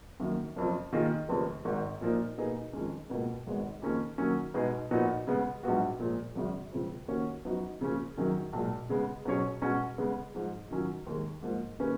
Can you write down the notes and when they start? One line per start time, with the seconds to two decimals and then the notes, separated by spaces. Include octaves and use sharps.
0.20 F#2 D#3 A#3
0.56 F#1 F2 F3
0.93 D#3 A#3 F4 G#4 D#5
1.29 F1 D#2 C#3 F3
1.65 G#1 G#2 D#3
2.01 A#2 F3 A#3 D#4
2.38 B2 A#3 D#4 G#4 B4
2.73 F2 D#3 G#3 C#4
3.10 C#2 B2 A#3
3.46 G#1 G#2 D#3 G#3 B3
3.82 F2 D#3 A#3 C#4 G#4
4.18 D#3 F#3 A#3 C#4
4.54 B2 G#3 D#4 G#4 B4
4.91 A#2 F3 B3 D#4 F#4
5.27 C#3 G#3 B3
5.63 A#1 G#2 F#3 B3 F#4
5.99 A#2 F3 G#3
6.35 G#1 F#2 C#3
6.72 C#2 C#3 F3
7.08 D#3 A#3 C#4 F#4 C#5
7.45 F#2 F3 B3 D#4 F#4
7.81 C#3 F3 A#3 C#4 F4
8.17 F#2 D#3 F#3 C#4 G#4
8.53 B1 A#2 G#3
8.90 C#3 G#3 B3
9.25 B2 F#3 C#4 G#4 C#5
9.62 B2 G#3 C#4 F#4
9.98 C#3 G#3 B3
10.35 G#2 F3 G#3 D#4
10.71 D#3 F#3 C#4 F4
11.06 D#2 D#3 G#3
11.43 G#2 F3 A#3
11.79 D#3 A#3 C#4 G#4 B4